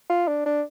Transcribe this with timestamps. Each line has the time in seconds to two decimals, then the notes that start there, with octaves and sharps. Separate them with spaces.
0.10 F4
0.28 D4
0.46 D4